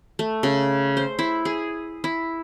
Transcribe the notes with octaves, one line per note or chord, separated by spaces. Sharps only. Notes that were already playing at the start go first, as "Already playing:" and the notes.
A3
C#3
C5
E4
G#4
E4